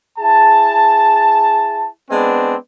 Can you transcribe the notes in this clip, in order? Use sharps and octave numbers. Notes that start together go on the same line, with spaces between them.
E4 G#4 A5
G#3 B3 C4 D4 B4